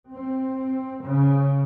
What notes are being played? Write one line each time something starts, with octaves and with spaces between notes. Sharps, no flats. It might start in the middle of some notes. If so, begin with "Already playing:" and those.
C4
C#3